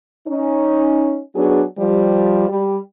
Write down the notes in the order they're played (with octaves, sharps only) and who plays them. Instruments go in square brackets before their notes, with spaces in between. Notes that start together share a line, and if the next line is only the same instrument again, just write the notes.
[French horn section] C#4 D#4
F#3 B3 D4 F#4 G#4
F3 G3
G3